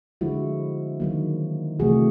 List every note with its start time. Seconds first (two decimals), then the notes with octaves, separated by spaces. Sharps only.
0.21 D3 F3 G#3 E4 F#4
1.00 D#3 F#3 A#3
1.80 C3 E3 A3 F#4 G#4